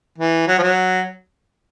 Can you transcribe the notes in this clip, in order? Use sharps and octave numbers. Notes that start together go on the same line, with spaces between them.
E3
F#3
F3
F#3